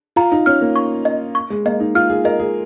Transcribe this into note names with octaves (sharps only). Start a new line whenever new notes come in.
F4 A#5
D#4
C#4 F6
A#3
C#6
D#5
C#6
G#3
A#3 D#5
D#4
F4 F6
G#4
A#4 D#5
G#4